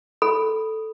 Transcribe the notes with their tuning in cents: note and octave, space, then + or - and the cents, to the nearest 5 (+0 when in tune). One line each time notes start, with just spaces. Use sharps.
A4 +0 B5 +0